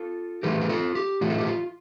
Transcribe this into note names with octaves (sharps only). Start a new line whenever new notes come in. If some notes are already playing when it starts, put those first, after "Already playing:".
Already playing: F4 A4
A2 E3 A3 G4 A#4
A#4
F4 A4
G4
A2 E3 A3 F4
A4
G4
F4